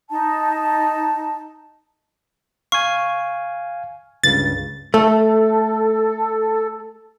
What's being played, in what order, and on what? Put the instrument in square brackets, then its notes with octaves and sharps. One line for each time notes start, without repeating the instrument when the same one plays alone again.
[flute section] D#4 A5
[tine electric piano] F5 G#5 [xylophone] C#6
[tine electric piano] C#2 G2 C#3 [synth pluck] A6
[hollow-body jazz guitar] A3 [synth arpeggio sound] A4